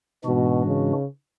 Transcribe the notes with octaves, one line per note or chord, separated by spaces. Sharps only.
G#2 B2 E3 G#3 D4 F#4
C#3